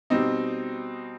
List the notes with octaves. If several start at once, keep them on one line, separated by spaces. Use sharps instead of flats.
B2 G3 C4 D#4